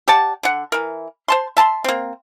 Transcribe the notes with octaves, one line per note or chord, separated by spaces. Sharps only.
G4 D5 F#5 A5
D3 F#5
E3 A#4
C5 A5 C6
E5 A5 B5 C6
A#3 C4